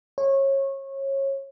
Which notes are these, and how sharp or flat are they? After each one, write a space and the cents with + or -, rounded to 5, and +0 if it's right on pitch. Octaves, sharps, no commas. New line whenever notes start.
C#5 -25